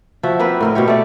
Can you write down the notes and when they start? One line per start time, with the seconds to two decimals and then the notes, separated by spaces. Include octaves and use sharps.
0.23 F3 F#4 E5
0.39 A#3 C4 E4 B4
0.60 A2 A#4 D#5
0.75 B2 C4 G4 C#5
0.88 A3 D5